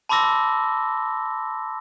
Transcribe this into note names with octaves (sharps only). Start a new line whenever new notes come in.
A5 B5 C6 D6 E6 A#6